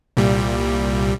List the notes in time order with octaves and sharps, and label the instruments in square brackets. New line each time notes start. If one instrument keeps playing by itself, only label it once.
[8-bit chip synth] C2 A#2 G3